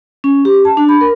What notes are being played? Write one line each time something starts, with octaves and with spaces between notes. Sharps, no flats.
C#4
G4
A5
D4
B5
A#4